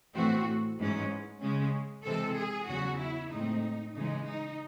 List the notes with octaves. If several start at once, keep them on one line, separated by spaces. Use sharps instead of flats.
A2 E3 C4 F#4
G#2 E3 G#3 C#4
C#3 G#3 C#4
C3 E3 G#3 C4 A4
G#4
E2 C#3 F#3 C#4 F#4
E4
A2 G#3 C4 D#4
C#3 E3 G#3 D#4
D#4